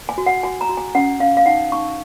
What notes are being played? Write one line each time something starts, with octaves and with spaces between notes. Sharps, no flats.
G#5
F#4
F#5
F#4 G#5
A#5
F#4
G#5
C#4 F#5
C#4 F5
F5
D#4 F#5
D#4 C#6